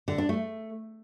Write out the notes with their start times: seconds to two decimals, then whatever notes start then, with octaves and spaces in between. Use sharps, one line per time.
0.08 D3
0.18 D4
0.29 A3